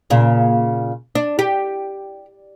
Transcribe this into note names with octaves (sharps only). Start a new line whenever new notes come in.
A#2 C#3
D4
G4